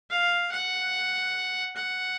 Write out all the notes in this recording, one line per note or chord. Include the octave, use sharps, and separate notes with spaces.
F5
F#5
F#5